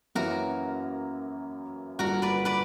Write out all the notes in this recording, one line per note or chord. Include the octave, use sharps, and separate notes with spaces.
F#2 E3 A#3 C#4 E4 F#4 A#4
G1 G2 F#3 A#3 F#4 A#4
B4 D5
B4 D5